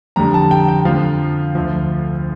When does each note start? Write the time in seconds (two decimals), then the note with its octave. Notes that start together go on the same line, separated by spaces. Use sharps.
0.16 F2 D3 G3 A#5
0.34 A5
0.51 G5
0.69 G5
0.85 F2 D3 F3 F5
1.55 D2 D3 F3